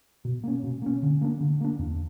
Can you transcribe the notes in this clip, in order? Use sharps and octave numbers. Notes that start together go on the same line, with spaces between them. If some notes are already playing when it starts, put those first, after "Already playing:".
B2
A#3 C#4
B2
A#3 C#4
D3
A#3 D4
D3
A#3 D4
E2